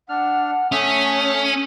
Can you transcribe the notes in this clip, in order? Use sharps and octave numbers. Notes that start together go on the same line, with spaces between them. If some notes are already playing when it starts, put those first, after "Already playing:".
D4 F#5 F6
A3 C#4 E5 G#5 D#6